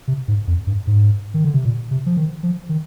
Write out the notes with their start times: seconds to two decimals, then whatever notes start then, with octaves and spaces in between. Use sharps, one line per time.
0.08 C3
0.28 G#2
0.47 F2
0.67 G2
0.87 G#2
1.34 D#3
1.45 D3
1.54 C3
1.65 A#2
1.91 C3
2.06 F3
2.17 D#3
2.43 F3
2.69 D#3